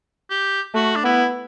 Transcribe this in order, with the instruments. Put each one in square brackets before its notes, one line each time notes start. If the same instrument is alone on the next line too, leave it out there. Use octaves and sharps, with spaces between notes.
[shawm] G4
[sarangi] A3 [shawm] F#4
[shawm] D4
[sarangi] B3 [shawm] E4